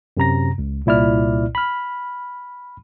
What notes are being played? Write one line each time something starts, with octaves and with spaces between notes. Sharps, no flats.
F#2 C3 A#5 A#6
C#2
C2 A#2 E4 D5 F6
B5 F6